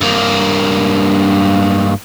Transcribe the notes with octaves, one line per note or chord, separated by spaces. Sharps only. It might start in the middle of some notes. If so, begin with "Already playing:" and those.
G2 A#3